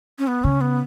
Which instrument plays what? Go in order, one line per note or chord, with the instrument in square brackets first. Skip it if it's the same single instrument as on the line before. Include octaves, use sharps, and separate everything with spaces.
[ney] C#4
B3
[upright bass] C#3 [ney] C#4
[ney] B3